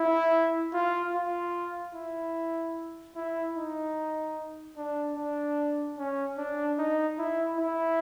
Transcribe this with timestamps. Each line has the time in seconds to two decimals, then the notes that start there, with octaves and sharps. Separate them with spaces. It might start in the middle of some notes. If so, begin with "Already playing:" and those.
Already playing: E4
0.73 F4
1.14 F4
1.95 E4
3.16 E4
3.56 D#4
4.77 D4
5.17 D4
5.98 C#4
6.38 D4
6.79 D#4
7.19 E4
7.59 E4